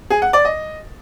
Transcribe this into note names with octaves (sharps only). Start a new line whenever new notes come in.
G#4
F#5
D5
D#5